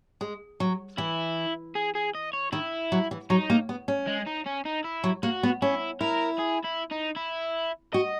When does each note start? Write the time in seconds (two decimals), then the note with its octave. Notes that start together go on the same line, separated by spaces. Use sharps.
0.21 G#3
0.60 F#3
0.98 E3 E4
1.75 G#4
1.95 G#4
2.15 D#5
2.33 C#5
2.53 D#3 E4
2.92 F#3
3.11 E3
3.30 F#3 D#4
3.50 A#3
3.69 B3
3.88 C#4
4.07 G#3
4.26 D#4
4.46 C#4
4.65 D#4
4.84 E4
5.04 F#3
5.23 A#3 F#4
5.43 B3
5.62 C#4 E4
6.01 E4 A#4
6.39 G#4
6.65 E4
6.91 D#4
7.16 E4
7.93 F#4 D#5